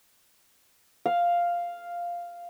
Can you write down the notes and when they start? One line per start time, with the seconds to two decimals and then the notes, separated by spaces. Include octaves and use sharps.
1.06 F5